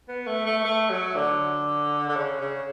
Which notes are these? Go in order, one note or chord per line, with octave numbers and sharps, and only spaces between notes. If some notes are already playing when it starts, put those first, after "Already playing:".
B3
A3
A3
A3
F#3
D3
D3
C#3
C#3